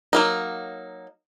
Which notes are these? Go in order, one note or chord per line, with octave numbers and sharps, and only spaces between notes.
F#3 A#3 D#4